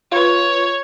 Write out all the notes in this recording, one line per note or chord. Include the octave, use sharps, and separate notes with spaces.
F4 B4 C#5